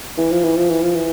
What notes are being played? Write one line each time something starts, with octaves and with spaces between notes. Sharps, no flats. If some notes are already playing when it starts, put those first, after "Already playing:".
E3
F3
E3
F3
E3
F3
E3